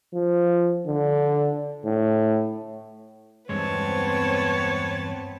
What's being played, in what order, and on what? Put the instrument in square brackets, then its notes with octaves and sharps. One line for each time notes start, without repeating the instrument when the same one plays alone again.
[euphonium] F3
D3
A2
[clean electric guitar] E2 G2 G#3 [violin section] B3 C4 [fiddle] B4 A5 [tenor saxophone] C#5